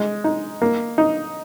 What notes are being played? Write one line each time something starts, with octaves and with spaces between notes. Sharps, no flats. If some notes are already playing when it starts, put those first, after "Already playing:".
Already playing: G#3
D#4
A#3
D#4